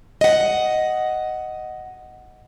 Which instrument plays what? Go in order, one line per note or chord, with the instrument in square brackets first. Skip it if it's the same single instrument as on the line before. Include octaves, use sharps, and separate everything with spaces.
[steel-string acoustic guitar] D#5 F#5